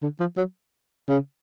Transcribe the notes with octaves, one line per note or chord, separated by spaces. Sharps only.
D3
F3
F#3
C#3